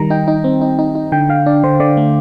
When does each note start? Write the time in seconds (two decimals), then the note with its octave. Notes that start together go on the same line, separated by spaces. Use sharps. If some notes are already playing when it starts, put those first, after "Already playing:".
Already playing: D#3 G3 A#5
0.10 D#4 G5
0.28 D#4
0.44 C4
0.61 D#4
0.79 D#4
0.95 D#4
1.12 D3 G5
1.29 D3 F5
1.46 D4 D5
1.63 D3 C5
1.80 D3 D5
1.97 A3